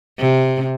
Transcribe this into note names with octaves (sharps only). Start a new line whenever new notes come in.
C3